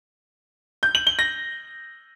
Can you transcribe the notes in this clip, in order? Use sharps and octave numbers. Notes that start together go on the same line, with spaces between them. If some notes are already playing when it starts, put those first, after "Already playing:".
G6
F#7
G7
A#6